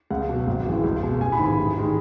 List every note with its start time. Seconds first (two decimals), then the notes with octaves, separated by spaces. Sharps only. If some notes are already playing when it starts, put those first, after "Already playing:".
0.10 C#2 F#5
0.29 B2 F#3
0.47 G#1
0.65 F#2 E3 G#3
0.84 C#2
1.03 B2 G#3
1.20 A1 G#5
1.32 B5
1.39 G#2 D#3 G#3
1.46 B5
1.57 A1
1.78 D#3 G#3